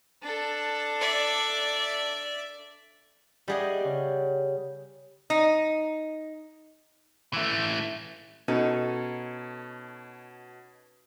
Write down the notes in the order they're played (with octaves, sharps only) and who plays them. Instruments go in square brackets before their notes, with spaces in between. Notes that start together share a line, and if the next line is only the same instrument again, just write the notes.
[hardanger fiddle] D4 A4
[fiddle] D5 E5
[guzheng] G3 G#4 D#5 [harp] E5 F#5 D6
[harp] C#3 G4
[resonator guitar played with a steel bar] D#4
[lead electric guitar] E3 A3
[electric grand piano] B2 [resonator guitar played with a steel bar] C#4 D#4 A4